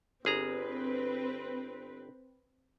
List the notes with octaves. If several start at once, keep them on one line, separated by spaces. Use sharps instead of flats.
G1 C4 G#4 B4 A#5